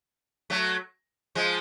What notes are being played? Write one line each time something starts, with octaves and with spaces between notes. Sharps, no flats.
F#3 A3
F3 G#3